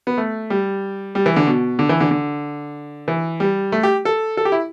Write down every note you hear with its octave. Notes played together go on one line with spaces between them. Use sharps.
B3
A3
G3
G3
E3
D3
B2
D3
E3
D3
D3
E3
G3
A3
G4
A4
A4
G4
E4